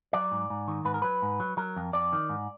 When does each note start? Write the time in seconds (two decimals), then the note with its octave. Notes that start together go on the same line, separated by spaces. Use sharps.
0.13 F#3 D5
0.31 G#2
0.50 G#2
0.68 D#3
0.85 G#2 B4
0.94 A#4
1.02 F#3 B4
1.22 G#2
1.40 F#3
1.57 F#3 A#4
1.77 F2
1.93 F2 D5
2.13 D#3
2.29 G#2